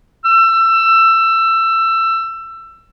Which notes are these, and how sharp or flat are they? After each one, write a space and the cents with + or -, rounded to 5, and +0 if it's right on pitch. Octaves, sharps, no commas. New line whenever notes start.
E6 +20